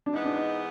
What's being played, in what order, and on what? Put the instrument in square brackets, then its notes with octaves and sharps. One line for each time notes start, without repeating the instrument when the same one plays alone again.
[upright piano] D4
[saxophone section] G#2 E3 G#3 B3 [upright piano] D#4
[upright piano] D4
D#4